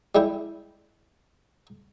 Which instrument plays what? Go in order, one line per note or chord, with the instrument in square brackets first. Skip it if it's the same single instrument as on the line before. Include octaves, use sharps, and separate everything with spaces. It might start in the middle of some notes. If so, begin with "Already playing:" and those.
[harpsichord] G3 G#3 E4 G5